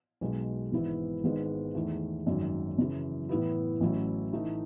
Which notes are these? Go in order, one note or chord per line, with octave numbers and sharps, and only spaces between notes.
B1 B2 G#3
G#1 G#2 E3 B3 E4
G#1 G#2 D#3 G#3 B3
E2 D#3 A3
G#1 F#2 D#3 F#3
F#2 C#3 E3
A2 E3 B3 E4
A1 A2 F#3 C#4 E4
A2 E3 A3 D#4